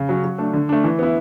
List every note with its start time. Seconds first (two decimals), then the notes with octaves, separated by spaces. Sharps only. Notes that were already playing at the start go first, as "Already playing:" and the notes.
Already playing: C#3
0.09 F#3 C#4
0.24 F#3
0.38 A3 D4
0.53 D3
0.69 A3 D4
0.84 E3
0.99 B3 E4